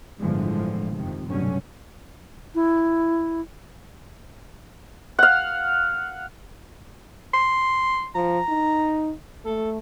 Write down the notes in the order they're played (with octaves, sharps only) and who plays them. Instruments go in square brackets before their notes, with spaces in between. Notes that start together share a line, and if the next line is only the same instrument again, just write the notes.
[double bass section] G1 A2 D3 E3 F3 G#3
F2 C3 D#3
F1 G2 B2 D3 F#3 C#4
[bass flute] E4
[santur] F5 F#5
[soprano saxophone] C6
[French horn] F3 [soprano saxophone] A#5
[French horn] D#4
[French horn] A3 [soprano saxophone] A4